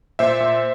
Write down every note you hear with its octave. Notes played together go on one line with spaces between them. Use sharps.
A#2 C5 E5
A#2